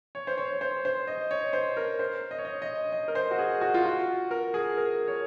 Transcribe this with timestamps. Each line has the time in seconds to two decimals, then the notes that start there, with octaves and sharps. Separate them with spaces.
0.15 C#5
0.27 C5
0.38 C#5
0.52 C#5
0.61 C5
0.85 C5
1.07 D#5
1.31 C#5
1.53 C5
1.77 A#4
1.99 C5
2.31 D#5
2.38 C#5
2.45 D#5
2.62 D#5
2.92 D#5
3.08 A#4
3.15 C5
3.31 F#4
3.39 G#4
3.61 F#4
3.74 F4
3.85 F#4
4.31 A#4
4.54 G#4
4.77 A#4
5.08 C#5